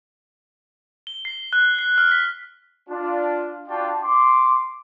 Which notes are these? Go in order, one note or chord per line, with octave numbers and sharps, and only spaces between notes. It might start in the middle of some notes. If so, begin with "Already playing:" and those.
G7
C7
F#6
C7
F6
B6
D4 F4
D4 F4 F#4 D5 G5 A5
C6 D6